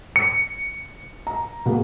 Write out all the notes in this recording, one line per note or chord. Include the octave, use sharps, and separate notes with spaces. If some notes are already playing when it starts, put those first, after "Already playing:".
C#7
A#5
B2 A#3 G#4